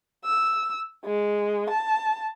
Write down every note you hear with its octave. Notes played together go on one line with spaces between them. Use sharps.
E6
G#3
A5